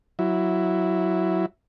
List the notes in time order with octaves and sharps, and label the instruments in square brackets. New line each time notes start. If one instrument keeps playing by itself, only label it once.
[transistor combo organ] F#3 E4